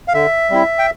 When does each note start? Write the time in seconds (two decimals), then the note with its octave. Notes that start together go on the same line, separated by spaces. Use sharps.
0.08 F5
0.14 D3 E5
0.50 G3 C4 E4
0.78 G5